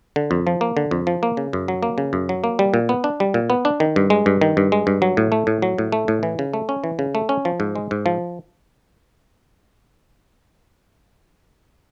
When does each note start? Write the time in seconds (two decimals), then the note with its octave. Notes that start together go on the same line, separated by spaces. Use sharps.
0.16 D3
0.31 F2
0.47 F3
0.61 A#3
0.77 D3
0.91 F2
1.07 F3
1.23 A#3
1.37 C#3
1.53 F#2
1.68 F#3
1.83 A#3
1.98 C#3
2.13 F#2
2.29 F#3
2.44 A#3
2.59 G3
2.74 A#2
2.89 B3
3.04 D4
3.20 G3
3.34 A#2
3.50 B3
3.65 D4
3.80 D#3
3.96 G2
4.10 G#3
4.26 G2
4.41 D#3
4.57 G2
4.72 G#3
4.87 G2
5.02 F#3
5.17 A2
5.32 A3
5.47 A2
5.62 F#3
5.78 A2
5.92 A3
6.08 A2
6.23 E3
6.39 C#3
6.54 A3
6.69 C#4
6.84 E3
6.99 C#3
7.15 A3
7.29 C#4
7.45 F3
7.60 G#2
7.75 G#3
7.91 G#2
8.06 F3